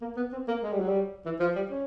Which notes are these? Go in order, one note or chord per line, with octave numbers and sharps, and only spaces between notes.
A#3
B3
C4
A#3
G#3
G3
F#3
G3
E3
F3
G3
C#4